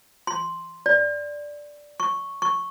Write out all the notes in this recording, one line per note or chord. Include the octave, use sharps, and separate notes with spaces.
C6
D5
C#6
C#6